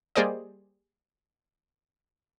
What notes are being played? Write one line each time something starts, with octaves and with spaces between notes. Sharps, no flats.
G3 A#3 G#4 C5 D5 D#5